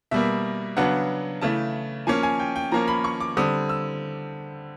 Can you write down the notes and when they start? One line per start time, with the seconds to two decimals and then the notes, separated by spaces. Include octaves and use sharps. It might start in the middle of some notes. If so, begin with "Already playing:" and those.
0.11 B2 G3 A#3 E5
0.77 C#3 F#3 B3 D4 F#5
1.41 C#3 E3 A3 A5
2.07 F3 A#3 C#4 G#5
2.23 G#5
2.40 G5
2.56 G5
2.72 F3 A#3 C#4 A#5
2.88 B5
3.04 C#6
3.20 D6
3.37 D3 G3 C4 D#6
3.69 E6